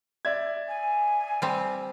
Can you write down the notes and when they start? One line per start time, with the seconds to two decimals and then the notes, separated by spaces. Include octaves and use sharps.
0.25 D5 E5 G#6
0.68 G#5
1.42 G3 C4